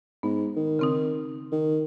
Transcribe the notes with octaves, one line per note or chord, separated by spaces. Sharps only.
G#2 B3
D#3
C#3 C4 D#4
D#3